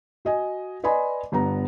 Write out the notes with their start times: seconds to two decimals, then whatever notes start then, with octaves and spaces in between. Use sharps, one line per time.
0.25 F#4 D#5 G#5
0.83 B4 D5 D#5 G#5 B5 C6
1.32 G1 G2 B3 A#5